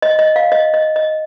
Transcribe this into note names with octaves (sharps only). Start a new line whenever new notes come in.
D#5
D#5
F5
D#5
D#5
D#5